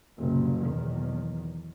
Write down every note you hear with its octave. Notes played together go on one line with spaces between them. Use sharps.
F#1 C2 A#2
B1 E2 D#3